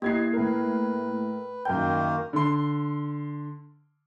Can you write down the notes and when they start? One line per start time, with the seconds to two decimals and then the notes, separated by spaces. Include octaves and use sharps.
0.02 A#3 B3 E4 G4 D#5 G#6 C7
0.33 A2 A#4 B4
1.65 F#2 D#3 A#3 A#4 G5 G6
2.33 D3 C6